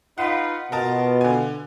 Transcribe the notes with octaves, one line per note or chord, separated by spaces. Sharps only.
D#4 F4 B4 F#5
B2 B3 F4 A#4 D#5 A5
D3 G#5